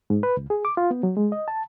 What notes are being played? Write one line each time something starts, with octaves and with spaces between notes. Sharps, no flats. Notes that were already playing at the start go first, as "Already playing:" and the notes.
G#2
B4
C#2
G#4
D6
F4
B3
F#3
G#3
D#5
A5